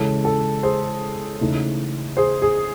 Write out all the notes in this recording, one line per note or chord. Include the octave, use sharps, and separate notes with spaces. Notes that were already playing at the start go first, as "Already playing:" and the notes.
Already playing: C#3 E3 G#3 C#4 A4
A4
G#4 C5
C#3 E3 A3 D#4
G#4 C5
G#4